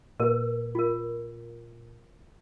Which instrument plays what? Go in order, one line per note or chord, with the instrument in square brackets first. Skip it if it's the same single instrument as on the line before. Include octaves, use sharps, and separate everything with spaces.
[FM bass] A#2 [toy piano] A#4 B4
[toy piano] F4 A#4